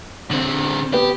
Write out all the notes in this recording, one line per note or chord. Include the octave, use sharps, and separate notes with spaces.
D3 C4
B3 G4